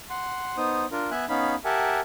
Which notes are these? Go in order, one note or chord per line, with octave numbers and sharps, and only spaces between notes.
F#5 C6
B3 D#4 C5 D#6
D4 F4 A#4
B3 E5 G#5 F#6
B3 C#4 D#4 F5 B5
G4 A#4 E5 F#5 G#5 A5